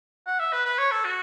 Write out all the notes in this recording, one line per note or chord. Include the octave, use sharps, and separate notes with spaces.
F#5
E5
B4
B4
C#5
A4
F#4